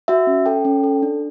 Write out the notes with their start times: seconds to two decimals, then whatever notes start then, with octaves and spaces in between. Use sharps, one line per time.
0.08 F#4 E5
0.27 C#4
0.46 A4 G5
0.65 C#4
0.84 A4
1.02 D4